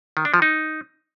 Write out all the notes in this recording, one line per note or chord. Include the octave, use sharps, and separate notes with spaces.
D#3
D4
F3
D#4